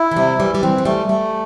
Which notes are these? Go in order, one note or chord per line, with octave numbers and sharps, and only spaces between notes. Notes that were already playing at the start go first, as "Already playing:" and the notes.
Already playing: E4
E3
C3 G3
E3 G3
G3
E3 C4
E3
G3 A3
G3 A3